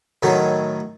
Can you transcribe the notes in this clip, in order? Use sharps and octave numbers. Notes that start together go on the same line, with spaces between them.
A2 D#3 F#3